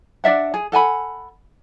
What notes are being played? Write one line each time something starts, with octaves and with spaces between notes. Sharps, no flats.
D4 D5 E5 F#5
G#4
A4 F#5 G#5 B5